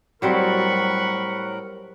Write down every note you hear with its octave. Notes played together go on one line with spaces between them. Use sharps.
A2 F#3 G3 C4 A#4 F#5 B5 C#6